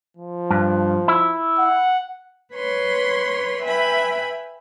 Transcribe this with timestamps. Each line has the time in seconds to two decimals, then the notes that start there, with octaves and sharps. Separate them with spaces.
0.17 F3
0.50 G2
1.08 E4
1.59 F#5
2.54 B4 C#5 C6
3.62 B4 E5 G5 G#5 B5